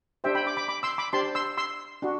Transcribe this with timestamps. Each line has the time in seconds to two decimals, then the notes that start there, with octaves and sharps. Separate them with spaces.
0.24 D4 G4 C5 E5 G5
0.35 G5 B5
0.46 B5 D6
0.57 B5 D6
0.68 B5 D6
0.83 C6 E6
0.98 B5 D6
1.13 D4 G4 C5 A5 C6
1.35 C6 E6
1.58 C6 E6
2.02 D4 F#4